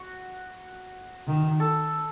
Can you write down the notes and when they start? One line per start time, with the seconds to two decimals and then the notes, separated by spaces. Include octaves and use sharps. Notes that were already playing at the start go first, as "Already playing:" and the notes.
Already playing: F#4
1.28 D#3
1.60 A4